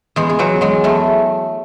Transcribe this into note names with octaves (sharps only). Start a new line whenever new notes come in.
E2 G#3 G#4
G#4
E2 F#3 F#4
F#3 G#3
E2 A3